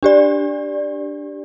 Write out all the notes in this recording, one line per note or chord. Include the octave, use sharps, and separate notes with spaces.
D4 G4 D5